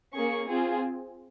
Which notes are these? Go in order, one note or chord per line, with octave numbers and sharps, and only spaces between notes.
A#3 C#4 G#4 C#6
C4 F4 G#4